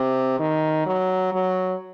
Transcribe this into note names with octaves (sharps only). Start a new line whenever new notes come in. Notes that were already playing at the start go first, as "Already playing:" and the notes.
Already playing: C3
D#3
F#3
F#3